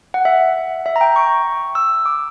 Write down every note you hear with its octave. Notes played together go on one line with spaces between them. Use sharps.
F#5
E5
E5
A#5
G5
C#6
E6
D6